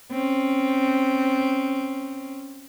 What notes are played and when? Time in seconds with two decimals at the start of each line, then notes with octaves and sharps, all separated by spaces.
0.12 C4 C#4